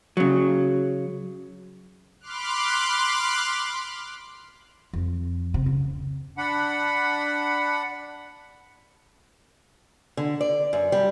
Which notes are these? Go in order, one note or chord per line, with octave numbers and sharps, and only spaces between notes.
C#3 F#3
B5 C6 D6 F6 F#6
F2
C3
C#3
D4 F#5 B5
D3
D5
F#2
G3